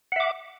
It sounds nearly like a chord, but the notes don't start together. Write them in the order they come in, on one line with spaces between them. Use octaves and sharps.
F#5 E5 D6